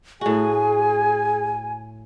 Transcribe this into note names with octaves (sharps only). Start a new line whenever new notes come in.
A2 F#4 G#4 G#5